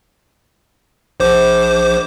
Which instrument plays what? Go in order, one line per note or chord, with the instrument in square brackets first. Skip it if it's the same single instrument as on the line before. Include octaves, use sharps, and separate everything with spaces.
[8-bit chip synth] A#1 C5 D6